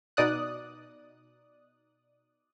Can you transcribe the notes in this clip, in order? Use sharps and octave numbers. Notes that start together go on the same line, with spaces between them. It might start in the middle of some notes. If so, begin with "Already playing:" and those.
B2 D#4 D5 D#6 F#6